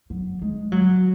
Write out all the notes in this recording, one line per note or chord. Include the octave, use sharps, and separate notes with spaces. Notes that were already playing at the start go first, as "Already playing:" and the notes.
F#3
G#3
F#3